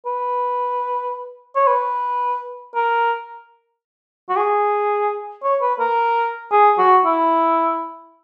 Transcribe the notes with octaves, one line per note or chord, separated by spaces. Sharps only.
B4
C#5
B4
A#4
F#4
G#4
C#5
B4
A#4
G#4
F#4
E4